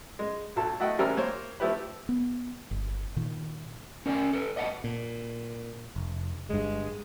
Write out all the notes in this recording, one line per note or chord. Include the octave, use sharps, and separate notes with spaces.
G#3
B1 F#3 A4 A5
A3 E4 F#4 D#5 F#5 G5
A1 G3 C4 A#4 G#5 E6
A#3 C5 C#5
F3 A3 E4 G4 B4
B3
G1
A#2 D#3
C#4 A#4 D5 G5 G#5
A4 B4
D5 D#5 F#5 G#5 A5
A#2
F1
G1 G2 G#3